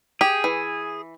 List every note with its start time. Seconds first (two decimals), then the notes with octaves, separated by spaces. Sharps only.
0.21 G4 G#4
0.44 E3